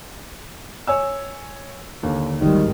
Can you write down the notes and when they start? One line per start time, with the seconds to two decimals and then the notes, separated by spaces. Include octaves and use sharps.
0.87 C#5 G#5 E6
2.03 D#2 D3
2.38 G#1 D#3 G3